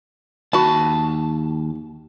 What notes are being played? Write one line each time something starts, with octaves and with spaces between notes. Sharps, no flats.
D#2 F#4 A5 B5